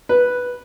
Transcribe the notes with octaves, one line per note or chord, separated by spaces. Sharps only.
B4